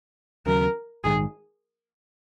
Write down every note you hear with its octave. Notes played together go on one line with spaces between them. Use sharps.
D#2 C#3 F#3 A#4
A#1 G#2 D#3 G#3 G#4